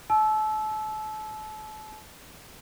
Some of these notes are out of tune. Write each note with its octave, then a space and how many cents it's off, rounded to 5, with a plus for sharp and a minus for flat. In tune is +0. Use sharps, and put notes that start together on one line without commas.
A5 -35 E6 +0